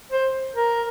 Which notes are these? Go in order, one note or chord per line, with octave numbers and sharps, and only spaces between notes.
C5
A#4